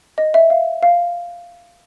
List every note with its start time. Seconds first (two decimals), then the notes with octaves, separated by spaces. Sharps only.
0.18 D#5
0.34 E5
0.50 F5
0.83 F5